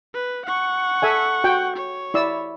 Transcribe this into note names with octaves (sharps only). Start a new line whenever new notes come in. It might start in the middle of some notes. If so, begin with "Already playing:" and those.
B4
F#5 C#6
A4 E5 G#5
F#4 G5
C#5
E4 D5 E6